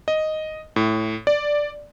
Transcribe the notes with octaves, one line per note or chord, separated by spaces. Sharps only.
D#5
A2
D5